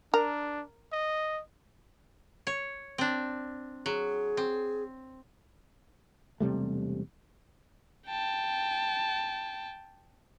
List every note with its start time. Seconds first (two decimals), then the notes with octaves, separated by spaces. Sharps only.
0.14 D4 A#4
0.92 D#5
2.47 C#5
2.98 C4 D4
3.86 F#3 G#4
4.37 C4
6.40 E1 C3 G3 A3
8.07 G5 A5